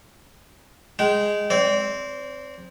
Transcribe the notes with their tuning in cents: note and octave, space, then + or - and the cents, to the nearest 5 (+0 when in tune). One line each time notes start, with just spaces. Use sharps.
G#3 +0 G5 -30
C4 +0 D5 -35